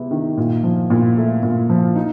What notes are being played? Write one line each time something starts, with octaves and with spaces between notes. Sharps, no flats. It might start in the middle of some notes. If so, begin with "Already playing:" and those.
Already playing: C3 G#3 B3
D#3
A#2
F3
A#2
A3
A#2
F3
D#4